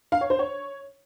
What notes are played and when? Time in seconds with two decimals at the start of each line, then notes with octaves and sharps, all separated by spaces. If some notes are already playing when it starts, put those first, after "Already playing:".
0.12 F5
0.21 C#5
0.30 C5
0.39 C#5